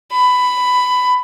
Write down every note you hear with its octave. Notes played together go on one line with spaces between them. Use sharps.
B5